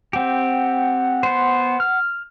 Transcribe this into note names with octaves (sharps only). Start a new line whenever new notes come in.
C4 G4 F#5
B3 C5
F6